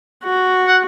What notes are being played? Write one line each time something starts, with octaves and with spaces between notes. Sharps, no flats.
F#4
F#5